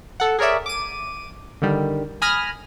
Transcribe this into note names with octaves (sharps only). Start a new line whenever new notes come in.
A4 F#5
G#4 A#4 C#5 D5 E5
D6 D#7
D3 D#3 G3
G#5 B5 D#6 F6 A#6